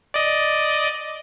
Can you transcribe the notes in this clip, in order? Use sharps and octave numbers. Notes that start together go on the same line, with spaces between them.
D5 D#5